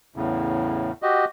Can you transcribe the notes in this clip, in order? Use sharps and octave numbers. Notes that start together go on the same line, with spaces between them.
E2 A2 C#3
F#4 G4 D#5